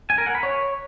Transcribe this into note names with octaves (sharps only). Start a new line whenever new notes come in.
G#5
A#4
F#5
B5
C#5